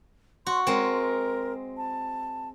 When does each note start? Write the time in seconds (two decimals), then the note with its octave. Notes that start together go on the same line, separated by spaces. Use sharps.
0.47 F#4 C6
0.67 G#3 C4 A#4
1.77 A5